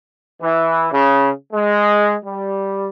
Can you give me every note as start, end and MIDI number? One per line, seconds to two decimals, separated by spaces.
0.41 0.87 52
0.92 1.29 49
1.52 2.15 56
2.23 2.89 55